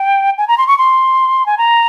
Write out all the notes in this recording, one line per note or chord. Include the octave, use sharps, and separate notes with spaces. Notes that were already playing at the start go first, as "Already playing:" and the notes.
Already playing: G5
G#5
A#5
C6
C#6
C6
G#5
A#5